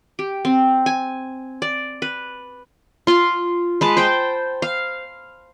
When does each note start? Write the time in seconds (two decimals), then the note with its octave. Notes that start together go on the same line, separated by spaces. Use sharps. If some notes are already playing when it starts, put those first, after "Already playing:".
0.19 G4
0.45 C4
0.86 G#5
1.62 D5
2.02 B4
3.07 F4 C6
3.81 G#3 B4 A5
3.97 C5 G5
4.62 F5